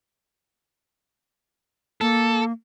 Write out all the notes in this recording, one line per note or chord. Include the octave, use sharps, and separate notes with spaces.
A#3 A4